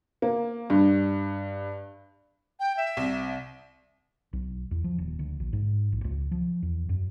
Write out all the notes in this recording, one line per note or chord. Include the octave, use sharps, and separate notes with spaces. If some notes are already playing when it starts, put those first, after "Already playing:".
A#3
G2
G5
E5
C2
B1
E2
F3
D#1
D2
A#1
G#2
A#1
C#2
F3
E2
F#2